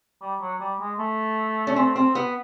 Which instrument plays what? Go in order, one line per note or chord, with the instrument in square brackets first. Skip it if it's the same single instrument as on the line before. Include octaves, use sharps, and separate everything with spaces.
[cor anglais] G3
F#3
G3
G#3
A3
[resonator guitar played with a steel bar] C#4
C4
C4
B3